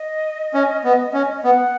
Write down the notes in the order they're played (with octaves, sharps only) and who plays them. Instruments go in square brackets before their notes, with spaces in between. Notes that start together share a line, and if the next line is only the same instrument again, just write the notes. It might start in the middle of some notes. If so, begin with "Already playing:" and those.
Already playing: [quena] D#5
[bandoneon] C#4
B3
C#4
[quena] D#5
[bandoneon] B3 [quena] F#5